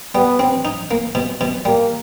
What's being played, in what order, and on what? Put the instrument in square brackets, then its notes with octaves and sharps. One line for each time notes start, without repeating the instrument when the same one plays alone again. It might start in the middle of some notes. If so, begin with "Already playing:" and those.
[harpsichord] G3 [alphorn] B3
[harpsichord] C4
D#4
A#3
B2
B2
[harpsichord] G3 [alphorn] A#3